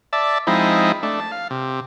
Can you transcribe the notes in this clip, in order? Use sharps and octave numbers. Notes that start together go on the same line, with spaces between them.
D5 E5 A5
F3 G#3 C4 D#4 E4
A3 D4
A5
F5
C3